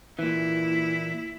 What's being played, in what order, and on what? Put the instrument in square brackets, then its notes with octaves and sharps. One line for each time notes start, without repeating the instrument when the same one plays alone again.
[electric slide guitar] A#2 E3 [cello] E4